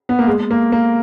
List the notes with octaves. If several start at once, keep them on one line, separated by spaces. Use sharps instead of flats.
B3
A#3
G#3
A#3
A#3